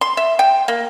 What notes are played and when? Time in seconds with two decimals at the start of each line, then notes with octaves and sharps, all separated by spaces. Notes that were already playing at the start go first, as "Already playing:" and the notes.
0.01 C6
0.17 E5
0.39 G5
0.68 A#3